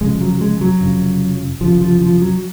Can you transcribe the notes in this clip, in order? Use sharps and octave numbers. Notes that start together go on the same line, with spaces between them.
F1 F2 C#3 G#3
F#3
G#3
F#3
F1 F2 C#3
F1 D#2 C#3 F3
F3
F3
F#3